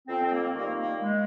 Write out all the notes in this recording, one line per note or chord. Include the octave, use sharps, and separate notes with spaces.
F2 C4
C4
A#3
D#3 G3 A#3
A#3
G#3